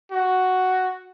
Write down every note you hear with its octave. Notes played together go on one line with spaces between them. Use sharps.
F#4